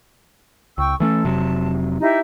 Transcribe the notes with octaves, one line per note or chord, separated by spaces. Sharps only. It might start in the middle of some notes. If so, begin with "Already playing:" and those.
C#2 G5 C#6 E6
E3 A3 C#4 A4
F1 C3 F#3 A5
D#4 E4 G4